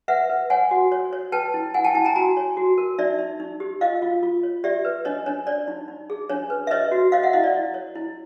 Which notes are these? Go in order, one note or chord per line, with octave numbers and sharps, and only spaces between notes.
B4 E5 F#5
B4
C#5 F#5 G#5
F#4
C#5
C#5
B4 G5 A5
E4
E4 F#5 G#5
G5 A5
E4 G5 A5
G#5 A#5
F#4 G#5 A#5
C#5
F#4
A#4
D#4 D5 E5
D#4
D#4
G4
F4 D#5 F5
F4
F4
C#5
G4 D5 E5
B4
D4 C#5 D#5
D4 C#5
C#5 D5
D#4
D#4
G#4
D4 C#5
B4
E5
B4 C#5 D#5
F#4
C#5 D#5 F5
E5 F#5
E4 D#5 F5
D5
E4
C#5
E4